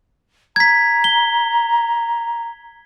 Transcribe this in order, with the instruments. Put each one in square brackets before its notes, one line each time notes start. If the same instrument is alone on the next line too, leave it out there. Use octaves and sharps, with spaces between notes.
[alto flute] A#5 [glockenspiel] G#6 B6
[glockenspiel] G7